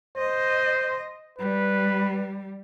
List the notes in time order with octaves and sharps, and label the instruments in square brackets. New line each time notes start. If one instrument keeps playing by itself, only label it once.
[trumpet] C5 [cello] D#5
[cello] G3 [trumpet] B4